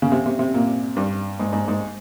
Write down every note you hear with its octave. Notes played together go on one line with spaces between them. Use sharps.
C#3
C3
C3
C3
A#2
G2
G#2
G#2
G#2